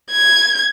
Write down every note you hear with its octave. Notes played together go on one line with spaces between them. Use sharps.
G#6